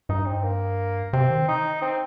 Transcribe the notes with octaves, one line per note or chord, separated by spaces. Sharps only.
G2 D#4
C4
A#3
C3 C4
D#3
D#4
C4